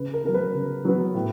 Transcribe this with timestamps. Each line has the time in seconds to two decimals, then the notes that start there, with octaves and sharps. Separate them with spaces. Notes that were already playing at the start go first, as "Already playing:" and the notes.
Already playing: C#3 B4
0.14 A#4
0.24 F#3 B3 A#4
0.34 B4
0.54 C#3
0.85 F#3 B3
1.15 A2